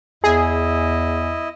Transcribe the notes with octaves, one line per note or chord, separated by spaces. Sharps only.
E2 E4 G#4 D#5